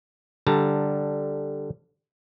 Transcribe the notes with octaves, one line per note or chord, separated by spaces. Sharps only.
D3 G3 A5 A#5